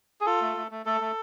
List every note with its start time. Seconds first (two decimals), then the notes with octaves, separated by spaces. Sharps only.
0.21 G#4
0.26 F4 A4
0.41 A3
0.57 A3
0.71 A3
0.85 A3 A4
1.01 A3